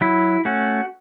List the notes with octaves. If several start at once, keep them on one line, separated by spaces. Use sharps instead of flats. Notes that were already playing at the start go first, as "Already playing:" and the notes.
F#3 E4
A3 C#4 F#4